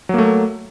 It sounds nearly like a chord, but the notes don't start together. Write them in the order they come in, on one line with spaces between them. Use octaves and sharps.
F#3 A#3 A3